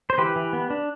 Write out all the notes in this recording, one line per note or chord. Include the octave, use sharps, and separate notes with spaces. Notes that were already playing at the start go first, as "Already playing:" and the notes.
C5
E3 G4 B4
E3
B3
D4